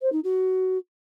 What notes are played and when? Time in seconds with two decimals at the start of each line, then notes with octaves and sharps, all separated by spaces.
0.01 C5
0.12 D#4
0.24 F#4